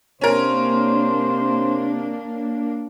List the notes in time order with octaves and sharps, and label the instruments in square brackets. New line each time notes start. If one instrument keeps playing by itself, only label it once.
[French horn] C3 [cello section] A#3 D4 [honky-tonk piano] C#4 A#4 [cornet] C5